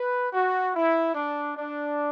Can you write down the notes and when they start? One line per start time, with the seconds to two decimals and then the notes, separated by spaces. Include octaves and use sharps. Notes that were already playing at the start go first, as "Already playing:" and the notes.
Already playing: B4
0.33 F#4
0.74 E4
1.15 D4
1.56 D4